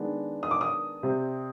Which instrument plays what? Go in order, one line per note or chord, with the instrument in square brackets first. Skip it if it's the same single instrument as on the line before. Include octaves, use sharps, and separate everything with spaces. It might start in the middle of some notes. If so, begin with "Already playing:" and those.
Already playing: [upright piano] D#3 G#3 B3 D4
D#6
D6
D#6
C3 G3 C4